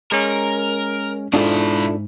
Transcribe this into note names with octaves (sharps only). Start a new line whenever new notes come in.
G#3 C#4 A#4
G#2 B2 D4 E4 F4 A4